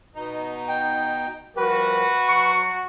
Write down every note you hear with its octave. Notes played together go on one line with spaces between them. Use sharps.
B2 D#4
G5
F3 G3 F#4 A#4 B4
F#3 C#6